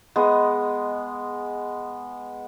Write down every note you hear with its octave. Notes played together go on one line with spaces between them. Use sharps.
G#3 B3 D#5